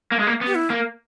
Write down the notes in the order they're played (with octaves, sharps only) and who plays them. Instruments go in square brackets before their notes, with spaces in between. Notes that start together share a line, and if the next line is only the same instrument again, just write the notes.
[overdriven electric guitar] A#3
G#3
A#3
B3
[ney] G4
E4
[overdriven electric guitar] A#3